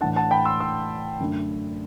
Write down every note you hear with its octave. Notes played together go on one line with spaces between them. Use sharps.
A2 E3 A3 D4 F#5 A5
F#5 A5
G5 B5
C6 E6
C6 E6
F#2 D3 A3 D4